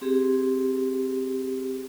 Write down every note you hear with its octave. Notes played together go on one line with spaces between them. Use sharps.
C4 G4 G#4